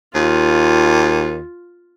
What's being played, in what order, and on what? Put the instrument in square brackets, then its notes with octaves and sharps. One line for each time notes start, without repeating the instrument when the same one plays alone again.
[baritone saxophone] D#2 [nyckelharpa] F4